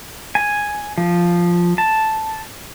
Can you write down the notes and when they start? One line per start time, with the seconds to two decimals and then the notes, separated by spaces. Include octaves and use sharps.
0.35 G#5
0.98 F3
1.78 A5